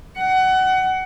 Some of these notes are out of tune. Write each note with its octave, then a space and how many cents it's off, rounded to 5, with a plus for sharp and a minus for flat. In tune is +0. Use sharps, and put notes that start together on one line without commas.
F#5 +25